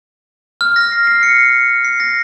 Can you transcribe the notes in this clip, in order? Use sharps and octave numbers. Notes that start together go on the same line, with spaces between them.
F6
A#6
C7
C7
C#7
C7
A#6